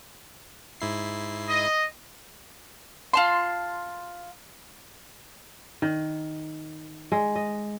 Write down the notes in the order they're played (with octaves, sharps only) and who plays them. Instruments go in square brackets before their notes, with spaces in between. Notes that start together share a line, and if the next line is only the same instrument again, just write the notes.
[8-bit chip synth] G#2 E4 C7
[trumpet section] D#5
[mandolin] F4 A5 C6
[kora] D#3
G#3
D#5